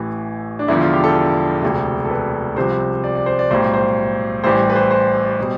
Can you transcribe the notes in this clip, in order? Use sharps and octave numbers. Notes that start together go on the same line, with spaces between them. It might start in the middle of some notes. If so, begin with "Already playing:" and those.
Already playing: A1 A2 E3
D4
E1 E2 D3 F3 E4
F4
G4
A4
E1 D2 C3
A4
B4
C2 C3 F3 C5
D5
D5
C5
D5
B1 A2 G3 C5
C5
A1 A2 E3 G3 C5
B4
C5
C5
B2 G3